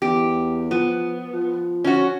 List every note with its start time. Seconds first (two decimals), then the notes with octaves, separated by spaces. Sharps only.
0.02 E2 G4
0.71 F3 B3
1.33 F3
1.84 C#4 F#4